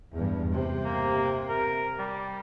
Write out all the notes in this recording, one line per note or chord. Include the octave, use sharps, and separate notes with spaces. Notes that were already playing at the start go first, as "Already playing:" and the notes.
E2 G2
C3
A#3
A#4
G3